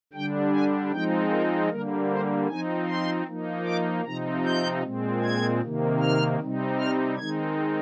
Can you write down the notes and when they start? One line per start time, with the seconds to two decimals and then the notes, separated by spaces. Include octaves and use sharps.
0.13 D3 G3 D4 G5
0.52 G#5
0.92 F3 G#3 C4 D#4 G5
1.31 A#4
1.69 D3 G3 A#3 A#4
2.09 C5
2.48 F3 C4 D#4 G#5
2.87 C6
3.26 F3 A#3 D#4
3.65 D6
4.05 C3 F3 C4 D#4 A#5
4.44 G6
4.83 A#2 G#3 C4
5.23 G#6
5.62 C3 D#3 A#3
6.00 F6
6.40 C3 G3 C4 D#4
6.79 F6
7.18 D#3 G#3 C4 D#4 G#6